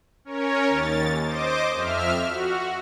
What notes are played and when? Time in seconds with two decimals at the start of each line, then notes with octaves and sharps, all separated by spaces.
0.25 C#4 A#4 C#5
0.68 D#2 A6
1.25 C5 D#5 D6
1.75 F2 E5 F6
2.28 F#4